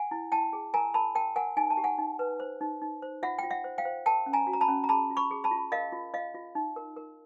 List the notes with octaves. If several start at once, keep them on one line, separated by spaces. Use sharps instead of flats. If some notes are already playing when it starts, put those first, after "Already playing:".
Already playing: F#5 G#5
E4
E4 G5 A5
G#4
A#4 G#5 A#5
A#4 A5 B5
A#4 G5 A5
A#4 F#5 G#5
D#4 G#5
A5
G4
F#5 G#5
D#4
B4
C5
D#4
D#4
C5
F4 E5 F#5
F4 G5
E5 F#5
C5
F5 G5
C5
A#4 G5 A5
C#4
G#5 A#5
F#4
A#5
A5 B5
C#4
A#5
G#4 A5 B5
F4
B5 C#6
G#4
A5 B5
F4
A#4 D#5 F5
F4
F4 D#5 F5
F4
D#4
A#4
A#4